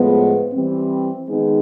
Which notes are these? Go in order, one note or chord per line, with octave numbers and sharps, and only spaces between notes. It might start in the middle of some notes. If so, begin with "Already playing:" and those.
Already playing: A2 F3 G#3 B3
E3 G3 C4
D#3 G#3 B3 D#4